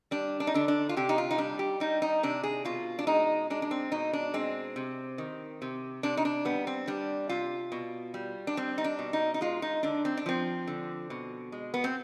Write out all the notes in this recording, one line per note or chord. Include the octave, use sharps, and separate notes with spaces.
G3 D4
D4
D#4
D3 D4
D4
F4
C3 G4
D#4
F4
D#4
G3 D4
G4
G3 D#4
D#4
C3 D4
G#4
B2 F4
D4
G#3 D#4
G#3 D4
D4
C4
B2 D#4
D4
G#3 C4
C3
D#3
C3
C3 D4
D#4
D4
G3 B3
C4
G3 D4
C3 F4
B2
G3
D4
G3 C4
D#4
D4
B2
D#4
D#4
G#3 F4
D#4
D3 D4
C4
D4
F3 C4
D3
B2
G#3
B3
C4